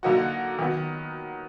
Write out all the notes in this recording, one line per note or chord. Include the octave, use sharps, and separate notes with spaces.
D3 F#3 A#3 D#4 F#4
D#3 F#3 B3